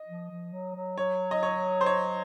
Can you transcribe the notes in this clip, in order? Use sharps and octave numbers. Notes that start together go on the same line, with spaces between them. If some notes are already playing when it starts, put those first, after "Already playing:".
Already playing: D#5
F3
F3
F#3
F#3
F#3 C#5
D#5
C#5
C5
C#5